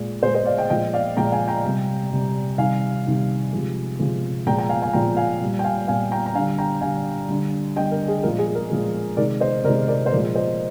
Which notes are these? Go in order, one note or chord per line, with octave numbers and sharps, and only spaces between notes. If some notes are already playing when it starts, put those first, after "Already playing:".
Already playing: A#2 G#3
A#2 G#3 G#4 C5
C5 D#5
D5 F5
D#5 G5
A#2 F3 G#3 D#5 G5
D5 F5
A#2 F3 G#3 G5 A#5
F5 G#5
G5 A#5
C3 G3
C3 G3
C3 D#3 G3 F5 G#5
C3 D#3 G3
C3 F3 G#3
C3 F3 G#3
A#2 F3 G#3 G5 A#5
G5 A#5
F5 G#5
F5 G#5
A#2 F3 G#3 G5 A#5
F5 G#5
A#2 G3
G5
F5 G#5
A#2 G3 F5 G#5
G5 A#5
A#5
D3 G3 F5 G#5
G5 A#5
D3 G3 F5 G#5
D3 G3
D3 G3 D#5 G5
A#4
G#4
A#2 F3 G#3 A#4
G#4
A#4
A#2 F3 G#3
C3 D#3 G#3 A#4 D5
C5 D#5
C3 D#3 G#3 A#4 D5
A#4 D5
C5
A#2 F3 G#3 A#4 D5
C5 D#5